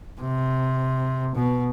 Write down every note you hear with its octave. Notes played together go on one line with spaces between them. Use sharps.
C3
B2